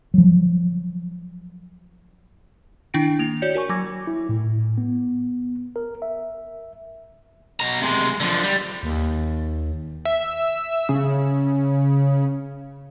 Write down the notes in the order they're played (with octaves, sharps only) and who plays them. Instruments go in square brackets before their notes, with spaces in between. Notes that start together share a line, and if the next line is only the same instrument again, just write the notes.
[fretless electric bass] F3 F#3
[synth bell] D#3 D4 E4 G5 A#6 D7
A#3 F7
F#4 C#5 D5 G6 C#7
F#4 A#4 G#5 C#6
F#3 G#5 D6 G#6 A#6
[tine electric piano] E4
A2
B3
A#4
E5
[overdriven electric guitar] B2 A#5
C3 G#3
D3 F3
G3
[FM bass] D#2
[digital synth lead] E5
C#3